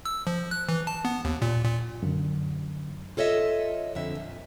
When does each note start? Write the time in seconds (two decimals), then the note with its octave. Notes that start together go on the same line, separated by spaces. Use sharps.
0.05 E6
0.27 F3
0.51 F#6
0.69 E3
0.87 A5
1.05 B3
1.25 D#2
1.42 A#2
1.65 A#2
2.03 F#2 D3
3.17 F4 A4 C#5 D#5 E5
3.95 F2 D3 E5
4.15 A#2